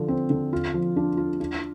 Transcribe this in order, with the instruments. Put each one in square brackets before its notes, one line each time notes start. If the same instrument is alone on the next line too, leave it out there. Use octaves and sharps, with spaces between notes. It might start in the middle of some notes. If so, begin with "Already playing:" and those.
Already playing: [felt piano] D3 F3
C4
D3
F4
F3
D4
F4
D4